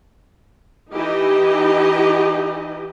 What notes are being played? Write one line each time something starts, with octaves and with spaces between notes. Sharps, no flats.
E3 D#4 E4 G4 D#5